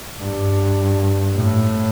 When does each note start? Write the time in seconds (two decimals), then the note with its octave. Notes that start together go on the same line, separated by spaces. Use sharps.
0.18 G2
1.35 A2